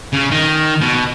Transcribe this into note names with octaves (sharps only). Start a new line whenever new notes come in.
C#3
D#3
B2